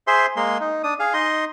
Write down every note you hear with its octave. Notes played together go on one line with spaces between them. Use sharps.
G#4 C5 E5 C6
G#3 A#3 C6
D#4
D4 D#6
G#4 F5
D#4 D#5 C6